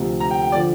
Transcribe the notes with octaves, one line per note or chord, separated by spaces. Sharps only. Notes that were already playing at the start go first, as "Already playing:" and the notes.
Already playing: D2 C3 F3
A#5
G5
G5
D3 F3 D5